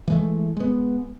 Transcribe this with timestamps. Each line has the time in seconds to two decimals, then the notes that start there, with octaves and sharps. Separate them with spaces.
0.08 E3 G#3 A3
0.57 G#3 B3